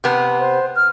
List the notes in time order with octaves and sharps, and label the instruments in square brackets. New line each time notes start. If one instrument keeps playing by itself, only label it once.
[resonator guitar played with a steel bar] C3 B3
[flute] C5
F6